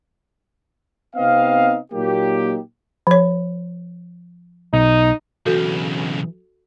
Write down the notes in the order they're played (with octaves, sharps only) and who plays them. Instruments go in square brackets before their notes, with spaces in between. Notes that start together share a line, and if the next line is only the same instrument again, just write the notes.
[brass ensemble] C3 B3 C4 D#4 D#5 F5
A#2 F#3 A#3 D#4 G4
[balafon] F3 C#5
[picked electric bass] B1 [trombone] D#4
[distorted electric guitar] B1 C#3 [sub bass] E3 [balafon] F#4 A4